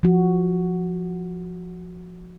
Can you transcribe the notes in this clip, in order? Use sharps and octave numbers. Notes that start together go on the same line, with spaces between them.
F3 F#4